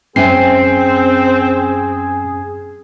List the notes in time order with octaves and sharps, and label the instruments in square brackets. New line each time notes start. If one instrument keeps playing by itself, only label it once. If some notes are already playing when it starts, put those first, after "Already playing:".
[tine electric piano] F#2 G5 C7 [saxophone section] C4 [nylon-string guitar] C#4 E5 G#5 [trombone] G#4